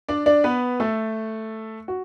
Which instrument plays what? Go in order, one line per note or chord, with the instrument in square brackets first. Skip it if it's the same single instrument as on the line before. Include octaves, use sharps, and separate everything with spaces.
[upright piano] D4 D5
D4 D5
B3 B4
A3 A4
F#4